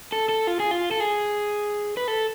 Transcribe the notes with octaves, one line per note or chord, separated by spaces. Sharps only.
A4
A4
F4
G#4
F4
A4
G#4
B4
A4